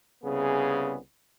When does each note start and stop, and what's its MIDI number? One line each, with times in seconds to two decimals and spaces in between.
0.24 0.97 36
0.24 0.97 49
0.24 0.97 59
0.24 0.97 68